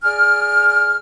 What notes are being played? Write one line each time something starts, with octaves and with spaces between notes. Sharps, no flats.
G#4 D5 G#5 F6